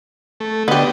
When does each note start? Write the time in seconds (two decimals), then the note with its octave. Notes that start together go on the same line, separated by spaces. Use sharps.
0.40 A3
0.68 D3 B3 G4 D#5